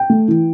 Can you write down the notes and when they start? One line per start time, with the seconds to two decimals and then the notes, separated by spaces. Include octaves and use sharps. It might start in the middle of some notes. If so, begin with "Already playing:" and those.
Already playing: G5
0.10 A3
0.28 E3